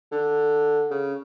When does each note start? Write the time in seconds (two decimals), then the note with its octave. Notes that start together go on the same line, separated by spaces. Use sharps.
0.12 D3
0.91 C#3